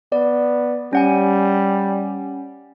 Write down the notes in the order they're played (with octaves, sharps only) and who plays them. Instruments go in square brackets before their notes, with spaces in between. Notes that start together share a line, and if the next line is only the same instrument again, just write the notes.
[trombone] B3 [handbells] D5
[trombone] G3 [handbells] C#4 F#5 G#5